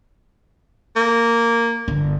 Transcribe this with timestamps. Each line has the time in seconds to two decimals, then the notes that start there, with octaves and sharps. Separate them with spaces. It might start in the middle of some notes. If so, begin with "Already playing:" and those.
0.96 A#3
1.88 G1